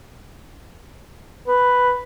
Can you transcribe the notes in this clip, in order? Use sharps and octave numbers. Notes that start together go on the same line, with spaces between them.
B4